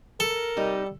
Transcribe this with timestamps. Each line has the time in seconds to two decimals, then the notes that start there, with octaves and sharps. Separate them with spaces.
0.20 A4 A#4
0.57 C3 G3 D#4 G4